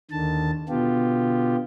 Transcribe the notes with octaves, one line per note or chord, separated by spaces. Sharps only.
D#2 D3 D#3 A5
B2 D3 B3 F4 G4